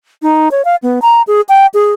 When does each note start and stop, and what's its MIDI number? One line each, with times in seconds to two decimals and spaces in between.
0.22 0.49 63
0.51 0.65 73
0.65 0.76 77
0.83 0.99 59
1.02 1.22 82
1.27 1.41 68
1.49 1.66 79
1.74 1.93 68